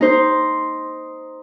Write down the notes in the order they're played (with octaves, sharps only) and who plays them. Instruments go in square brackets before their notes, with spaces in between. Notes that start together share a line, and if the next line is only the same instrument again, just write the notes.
[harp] D#4 C5